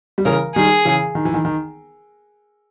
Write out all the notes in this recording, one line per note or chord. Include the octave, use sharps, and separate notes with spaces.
G3
C#3 E3 A#4
D#3 G3 G#4
C#3 E3
D#3
E3
D#3
D#3